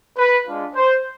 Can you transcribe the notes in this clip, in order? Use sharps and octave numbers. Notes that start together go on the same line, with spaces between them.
B4
G#3 D4 F4
C5